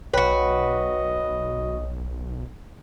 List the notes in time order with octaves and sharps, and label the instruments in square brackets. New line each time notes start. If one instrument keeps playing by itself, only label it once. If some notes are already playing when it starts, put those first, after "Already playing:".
[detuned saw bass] B1 [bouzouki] F#4 B4 [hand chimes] C#5 G5 [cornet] D#5